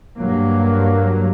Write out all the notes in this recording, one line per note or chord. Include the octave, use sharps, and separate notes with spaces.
G2 F#3 A#3